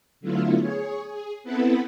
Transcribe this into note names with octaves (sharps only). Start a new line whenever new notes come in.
D3 F#3 A3 B3 E4 F4
G#4 C#5
G#4
B3 C4 E4 A4 B4 F#5